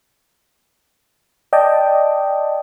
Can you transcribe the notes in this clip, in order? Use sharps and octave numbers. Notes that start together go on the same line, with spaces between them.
D5 D#5 G5 A5